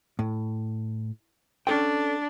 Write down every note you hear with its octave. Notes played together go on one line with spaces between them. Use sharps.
A2
C#4 D4 A4 G5